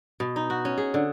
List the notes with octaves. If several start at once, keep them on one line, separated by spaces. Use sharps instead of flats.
B2
D#4
F#4
C#4
G#4
D3